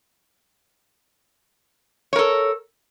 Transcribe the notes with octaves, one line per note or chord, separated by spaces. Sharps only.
A4 A#4 C#5